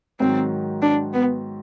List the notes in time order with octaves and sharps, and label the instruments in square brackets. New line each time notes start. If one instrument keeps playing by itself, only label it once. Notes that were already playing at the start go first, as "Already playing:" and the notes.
[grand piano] G#2 D#3 F#3 [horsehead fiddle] C4
[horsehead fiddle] D4
B3